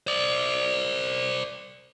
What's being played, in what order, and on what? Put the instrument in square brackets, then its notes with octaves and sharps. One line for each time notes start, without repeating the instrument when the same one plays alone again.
[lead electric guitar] C5 D5